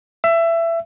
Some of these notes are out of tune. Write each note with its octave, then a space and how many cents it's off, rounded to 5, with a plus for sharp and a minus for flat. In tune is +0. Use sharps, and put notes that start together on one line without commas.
E5 +20